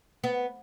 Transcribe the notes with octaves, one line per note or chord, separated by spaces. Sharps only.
B3